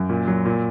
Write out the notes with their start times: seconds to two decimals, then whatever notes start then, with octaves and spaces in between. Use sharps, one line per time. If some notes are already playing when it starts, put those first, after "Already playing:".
Already playing: F#2
0.09 A#2
0.27 F#3
0.45 A#2